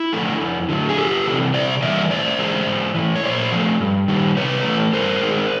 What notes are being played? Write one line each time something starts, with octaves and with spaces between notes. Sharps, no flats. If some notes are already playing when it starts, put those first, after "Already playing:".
Already playing: E4
D3 F3 A3
F2
D3 F#3 A3
G#4
F2 G4 A4
C3 E3
C3 C5 D5
E3 G3 D5 E5
A2 C5 D5
E3 G#3
G#2
E3 A3
C#5
A#2 C5 D5
F3 A3
G2
D#3 G3
C3 B4 C#5
E3 A3
G2 A#4 C5
D#3 G#3